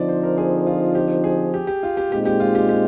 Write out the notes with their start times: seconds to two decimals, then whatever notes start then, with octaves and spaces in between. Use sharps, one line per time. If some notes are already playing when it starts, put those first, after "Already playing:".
Already playing: D3 F3 C4 D#4 D5
0.09 C5
0.23 A#4
0.38 G#4
0.66 F4
0.95 G4
1.24 G#4
1.54 G4
1.67 G4
1.83 F4
1.97 G4
2.12 A#2 G#3 C4 D#4 G4
2.25 G4
2.40 F4
2.55 G4
2.69 G4